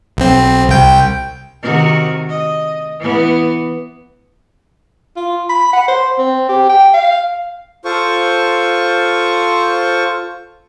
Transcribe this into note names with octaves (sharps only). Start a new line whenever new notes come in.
B1 C4
C2 G5
C3 D#3 F#4
D#5
E3 B3
F4
B5
F#5
C5
C4
G4
G5
F5
F4 A4 C5 C#6